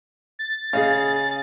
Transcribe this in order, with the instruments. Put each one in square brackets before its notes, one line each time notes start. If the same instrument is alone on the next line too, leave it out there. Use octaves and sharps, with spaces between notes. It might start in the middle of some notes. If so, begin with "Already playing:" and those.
[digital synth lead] A6
[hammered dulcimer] C#3 [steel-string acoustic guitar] G#4 D#5 F5